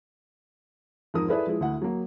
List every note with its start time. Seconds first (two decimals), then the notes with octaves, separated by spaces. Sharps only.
1.14 F2 G#2 A#4 D#6
1.28 E4 G#4 A4 B4 D5 E5
1.47 F3 G#3 E4
1.60 D2 E4 F#5
1.81 F#3 A#3